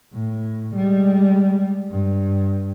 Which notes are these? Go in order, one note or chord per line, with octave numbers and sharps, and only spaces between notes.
A2
G3 G#3
G2